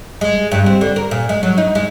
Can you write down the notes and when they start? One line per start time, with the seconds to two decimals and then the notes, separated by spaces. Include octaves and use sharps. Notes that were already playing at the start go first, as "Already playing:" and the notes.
0.21 G#3
0.51 G2
0.66 C4
0.81 D3
0.96 A#4
1.11 A#2
1.29 G#3
1.43 F#3
1.58 D#4
1.75 G#3